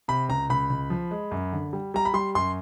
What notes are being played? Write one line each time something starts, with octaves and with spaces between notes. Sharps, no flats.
C3 B5
C#2 A#5
C#2 B5
C#2
F3
G#3
F#2
D3
G3
G3 A#5
B5
G3 C6
F#2 C6